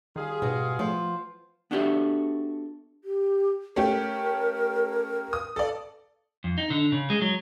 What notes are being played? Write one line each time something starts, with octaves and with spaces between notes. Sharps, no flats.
D#3 G3 F4 G#4
G#2 B2
F3 A3
B3 D4 F#4 G4 A4 E5
G4
A3 C#4 G4 A#4
D#6
A4 D5
F2
D#4
D3
C#3
G#3
F#3